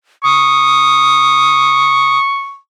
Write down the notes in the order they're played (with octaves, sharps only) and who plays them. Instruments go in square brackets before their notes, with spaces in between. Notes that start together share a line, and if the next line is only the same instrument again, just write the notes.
[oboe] C#6 [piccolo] D#6